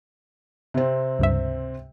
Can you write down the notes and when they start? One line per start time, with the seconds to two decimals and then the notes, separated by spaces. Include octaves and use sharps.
0.74 C3 C4
1.19 C#2 G2 E5